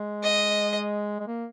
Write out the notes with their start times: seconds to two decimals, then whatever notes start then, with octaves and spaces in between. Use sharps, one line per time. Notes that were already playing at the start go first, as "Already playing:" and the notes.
Already playing: G#3
0.23 D#5
1.20 G#3
1.27 A#3